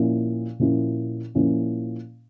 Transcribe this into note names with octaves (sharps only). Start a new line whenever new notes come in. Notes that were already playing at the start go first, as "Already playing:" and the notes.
Already playing: A#2 F3 A#3 C#4 E4
A#2 F3 A#3 C#4 E4
A#2 F3 A#3 C#4 E4